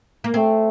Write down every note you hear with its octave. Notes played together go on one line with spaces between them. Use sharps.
A#3
A3 C4